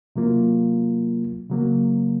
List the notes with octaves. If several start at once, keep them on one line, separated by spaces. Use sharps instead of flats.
C3 F#3 A#3 F4
C#3 F#3 A#3